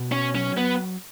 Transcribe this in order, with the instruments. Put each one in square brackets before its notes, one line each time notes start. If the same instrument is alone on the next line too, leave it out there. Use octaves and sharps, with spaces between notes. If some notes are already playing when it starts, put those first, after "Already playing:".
Already playing: [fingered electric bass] B2
[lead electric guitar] C#4
[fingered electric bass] F#3 [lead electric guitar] C#4
[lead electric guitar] B3